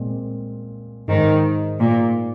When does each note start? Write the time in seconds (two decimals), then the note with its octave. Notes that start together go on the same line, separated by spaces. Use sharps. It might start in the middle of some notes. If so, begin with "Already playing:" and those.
Already playing: A#2 G#3 C4
1.07 G#2 D#3 G#3 D#4 G#4 C5
1.80 A#2